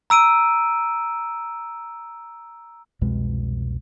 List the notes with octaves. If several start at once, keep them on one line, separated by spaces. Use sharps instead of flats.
A#5 E6 D7 D#7
C2 F2 B2 G#3